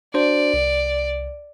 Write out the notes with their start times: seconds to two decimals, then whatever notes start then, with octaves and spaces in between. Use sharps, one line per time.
0.14 D4 F#4 C5 D5
0.54 C2